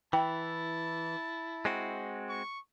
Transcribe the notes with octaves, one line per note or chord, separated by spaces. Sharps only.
E3 E4 G5 A5
G#3 C4 F#4
C#6